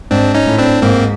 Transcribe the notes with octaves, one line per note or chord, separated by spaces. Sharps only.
G#2 C4 D4
C#4 D#4
A2
C4 D4
G#2 A#3 C4